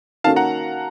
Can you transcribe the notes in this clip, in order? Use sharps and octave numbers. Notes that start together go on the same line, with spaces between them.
D#3 A#3 C#4 F#4 A4 F5 A5
F#5 A#5